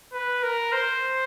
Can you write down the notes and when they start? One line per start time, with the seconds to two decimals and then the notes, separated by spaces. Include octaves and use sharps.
0.13 B4
0.43 A#4
0.72 C5